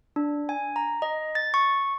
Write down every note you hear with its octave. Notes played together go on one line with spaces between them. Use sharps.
D4
G#5
A#5
D#5
A6
C#6